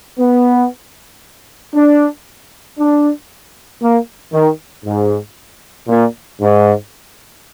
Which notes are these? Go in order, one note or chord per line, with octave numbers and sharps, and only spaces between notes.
B3
D4
D4
A#3
D#3
G#2
A#2
G#2